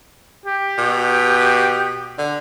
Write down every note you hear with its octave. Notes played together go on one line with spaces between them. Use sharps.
G4
B2
D3